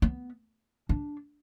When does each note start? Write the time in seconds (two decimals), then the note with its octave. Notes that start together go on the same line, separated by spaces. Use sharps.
0.02 B3
0.89 D4